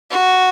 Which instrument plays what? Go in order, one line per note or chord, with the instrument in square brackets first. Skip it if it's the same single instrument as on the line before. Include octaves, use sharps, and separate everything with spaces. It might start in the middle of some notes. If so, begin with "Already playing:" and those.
[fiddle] F#4